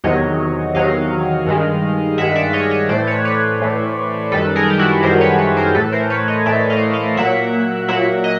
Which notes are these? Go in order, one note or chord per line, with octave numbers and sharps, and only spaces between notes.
E2 C3 D#3 F#3 C#5 D#5
E2 C3 D#3 F#3 D#5 F5
G2 D#3 G#3
G2 D#3 G#3 E5 F#5
D5 E5
C#5 D#5
C#5 D#5
A2 E3 A3 C5 D5
B4 C#5
B4 C#5
A2 E3 A3
F#2 D#3 G3 A4 B4
G#4 A#4
G4
E4 F#4
F#2 D#3 G3 A#4 C5
B4 C#5
B4 C#5
A#4 C5
A2 E3 A3 A4 B4
A#4 C5
B4 C#5
C#5 D#5
A2 E3 A3 D5 E5
D#5 F5
D#5 F5
A#2 F#3 A#3 E5 F#5
A#2 F#3 A#3 E5 F#5
D#5